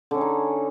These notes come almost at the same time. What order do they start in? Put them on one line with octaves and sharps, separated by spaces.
D3 C#4 G#4 D#4